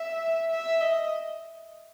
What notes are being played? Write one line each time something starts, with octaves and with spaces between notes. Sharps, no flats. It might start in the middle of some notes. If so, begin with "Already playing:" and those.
Already playing: E5
E5
D#5